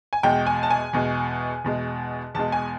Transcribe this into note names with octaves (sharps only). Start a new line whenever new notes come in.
G#5
E2 B2 G#3 G5
G#5
A5
G#5
E2 B2 G#3
E2 B2 G#3
E2 B2 G#3 A5
G#5